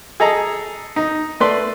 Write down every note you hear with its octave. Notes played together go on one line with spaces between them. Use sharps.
G#4 A4 D#5 A#5
D#4
A3 B4 D5 C6